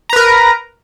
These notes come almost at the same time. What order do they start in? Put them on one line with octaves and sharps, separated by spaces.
A#5 B4 A#4